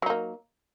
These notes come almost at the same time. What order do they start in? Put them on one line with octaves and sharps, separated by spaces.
F#3 D#4 A#3